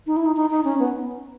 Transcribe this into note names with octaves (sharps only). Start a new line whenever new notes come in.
D#4
E4
D#4
D#4
D#4
C#4
B3